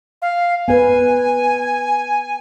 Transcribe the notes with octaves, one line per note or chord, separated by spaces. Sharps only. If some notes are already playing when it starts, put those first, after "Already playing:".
F5
B3 B4 G#5